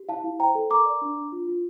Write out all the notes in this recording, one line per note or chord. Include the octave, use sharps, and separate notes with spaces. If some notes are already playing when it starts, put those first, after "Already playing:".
Already playing: G4
E4 F5 A5
E4
C5 G5 A#5
A4
A#4 A#5 D6
D5
D4
D4
F4
F4